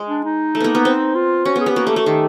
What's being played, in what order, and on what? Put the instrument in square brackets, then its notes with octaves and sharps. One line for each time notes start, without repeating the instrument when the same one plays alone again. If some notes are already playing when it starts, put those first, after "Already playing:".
Already playing: [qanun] G#3
[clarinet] D4
D#4
[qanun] A3
A#3 B3
B3
C4
[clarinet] F4
[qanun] C#4 [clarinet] F#4
[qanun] B3
[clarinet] G#4
[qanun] B3 [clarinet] G4
[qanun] A#3 [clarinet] F#4
[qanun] A3 [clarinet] G4
[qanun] A3 [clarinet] F#4
[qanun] D#3 [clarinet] G4